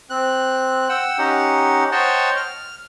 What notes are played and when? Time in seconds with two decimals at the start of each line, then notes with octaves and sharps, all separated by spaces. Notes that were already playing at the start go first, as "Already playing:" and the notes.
0.10 C4 F#6
0.89 F#5 G5 E6
1.18 C#4 D#4 G4 F#5
1.92 C5 C#5 D#5 F#5 G5 A5
2.37 F6